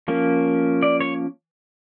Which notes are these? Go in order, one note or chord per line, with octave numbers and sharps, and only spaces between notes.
F3 A#3 C#4
D5
C#5